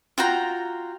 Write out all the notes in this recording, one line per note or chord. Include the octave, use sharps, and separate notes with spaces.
F4 F#4 G5 A#5